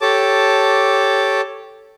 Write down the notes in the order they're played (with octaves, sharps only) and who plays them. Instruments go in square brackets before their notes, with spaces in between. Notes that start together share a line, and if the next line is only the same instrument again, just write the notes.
[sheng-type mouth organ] G4 A4 C#5 A5 D6